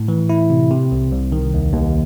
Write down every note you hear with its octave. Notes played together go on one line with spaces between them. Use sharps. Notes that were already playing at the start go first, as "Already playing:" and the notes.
Already playing: A2
E3
E4
C3
C3
C2
C2
D#3
D#2
D#2